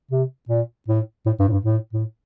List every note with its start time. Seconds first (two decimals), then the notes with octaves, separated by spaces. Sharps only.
0.11 C3
0.49 A#2
0.88 A2
1.26 A2
1.39 G2
1.48 A2
1.52 G2
1.65 A2
1.93 A2